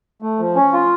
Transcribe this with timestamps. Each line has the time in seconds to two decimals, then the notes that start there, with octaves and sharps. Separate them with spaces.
0.22 A3
0.39 F3
0.56 C#4
0.73 F4